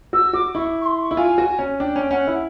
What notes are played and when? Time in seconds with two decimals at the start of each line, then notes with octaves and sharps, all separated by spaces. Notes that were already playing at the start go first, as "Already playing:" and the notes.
0.13 F#4 E6
0.33 F#4 D6
0.55 E4 C#6
0.81 C#6
0.85 C6
1.01 C#6
1.11 E4
1.17 F4 G#5
1.38 F#4
1.59 C#4
1.80 D4 G5
1.96 C#4
2.11 C#4 F#5
2.27 E4